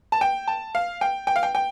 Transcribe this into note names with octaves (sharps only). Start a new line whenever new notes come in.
A5
G5
A5
F5
G5
G5
F5
G5
G5